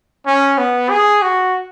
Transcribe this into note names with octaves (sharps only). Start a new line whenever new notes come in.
C#4
B3
G#4
F#4